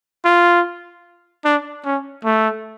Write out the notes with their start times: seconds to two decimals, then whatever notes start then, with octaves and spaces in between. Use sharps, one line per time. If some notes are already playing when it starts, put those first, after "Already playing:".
0.25 F4
1.45 D4
1.85 C#4
2.25 A3